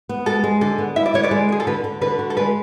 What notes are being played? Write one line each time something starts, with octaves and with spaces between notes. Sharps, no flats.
B3
G#3 A4
G#3
D3 A4
B3
E4 E5
D5
D3 C#5
B4 D5
G#3
D3 G#4
A4
D3 B4
D3
D3 B4
F#4
A4
G#3 B4